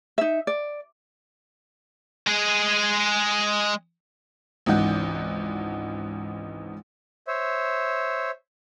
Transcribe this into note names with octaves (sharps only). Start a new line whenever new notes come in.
D#4 E5
D5
G#3 G#4
G#1 C#2 E3 D#4 F#5 G6
C5 C#5 E5